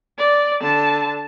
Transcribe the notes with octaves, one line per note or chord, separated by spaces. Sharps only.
D5
D3 A5